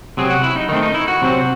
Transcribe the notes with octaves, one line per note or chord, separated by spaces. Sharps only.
C3 F#3 C4 G#4
F#4
E4
D#4
D#3 A3 C4 D#4
D#4
E4
F#4
C3 F#3 C4